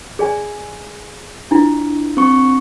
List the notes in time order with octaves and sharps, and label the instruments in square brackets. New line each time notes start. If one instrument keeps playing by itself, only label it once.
[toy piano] G#4 D5 G#5
D4 E4 F4
[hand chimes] C4 C#6